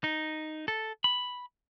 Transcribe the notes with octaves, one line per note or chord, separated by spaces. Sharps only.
D#4
A4
B5